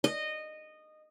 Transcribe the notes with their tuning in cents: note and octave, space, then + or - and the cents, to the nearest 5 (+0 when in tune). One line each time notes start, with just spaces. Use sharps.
D#5 -15